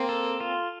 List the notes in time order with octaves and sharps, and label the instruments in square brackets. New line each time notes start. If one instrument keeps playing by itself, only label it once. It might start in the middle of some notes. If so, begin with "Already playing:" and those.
Already playing: [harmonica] A#3 [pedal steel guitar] C4
[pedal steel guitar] A4
F4